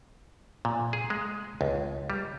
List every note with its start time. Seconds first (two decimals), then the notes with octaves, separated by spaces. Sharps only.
0.65 A#2
0.93 G#4
1.10 G#3
1.61 C#2
2.10 G3